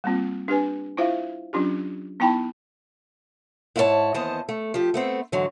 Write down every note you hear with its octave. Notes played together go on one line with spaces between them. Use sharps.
G3 A#3 C4 F4
D4 G4 B4 G#5
E4 F4 C5 E5 F5
F#3 C#4 D4 F4 G4
B3 D#4 E4 G5 A5 B5
G#2 E4 F#4 A4 C#5 A5
D#2 E3 B3 C5 D#5 A5
A3
F3 G4
A3 B3 C4
G#2 D3 E3 F#3